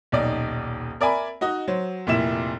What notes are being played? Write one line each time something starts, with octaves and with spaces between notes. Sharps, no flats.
D#1 B1 D#4 D5
A#4 D5 E5 G#5 B5
D#4 F#4 D#5
F#3 C5
F1 A#2 E4 E7